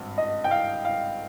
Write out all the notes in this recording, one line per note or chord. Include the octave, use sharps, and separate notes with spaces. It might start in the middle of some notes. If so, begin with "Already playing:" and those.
Already playing: G#1 G2
D#5
G5
F5
F5